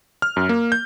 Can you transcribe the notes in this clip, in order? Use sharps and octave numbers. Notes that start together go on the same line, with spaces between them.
F6
F#2
A#3
G6